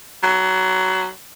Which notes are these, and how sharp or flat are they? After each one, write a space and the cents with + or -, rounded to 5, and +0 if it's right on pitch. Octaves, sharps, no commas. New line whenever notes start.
F#3 +20